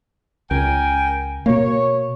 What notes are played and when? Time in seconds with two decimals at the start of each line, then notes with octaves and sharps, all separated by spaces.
0.51 C#2 A#4 G5 G#5
1.46 B2 A#3 C#5